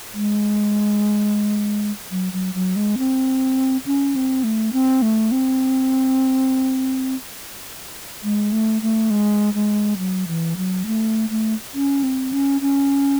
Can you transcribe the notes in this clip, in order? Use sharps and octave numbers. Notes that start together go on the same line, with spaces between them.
G#3
F#3
F#3
F#3
G#3
C4
C#4
C4
A3
C4
A3
C4
G#3
A3
A3
G#3
G#3
F#3
E3
F#3
A3
A3
C#4
C4
C#4
C#4